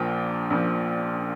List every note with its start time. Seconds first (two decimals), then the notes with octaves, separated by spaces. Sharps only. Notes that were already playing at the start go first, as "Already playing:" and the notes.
Already playing: A#1 A#2 F3 G5
0.50 A#1 A#2 F3